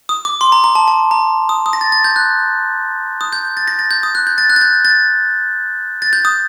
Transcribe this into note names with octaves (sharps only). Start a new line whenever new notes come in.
D#6
D6
C6
A#5
A#5
A5
A5
A#5
D#6
D#6
A#6
A6
A6
G6
F#6
D#6
G6
A6
A#6
A6
G6
D#6
F#6
G6
A6
F#6
A6
G6
A6
A6
G6
D#6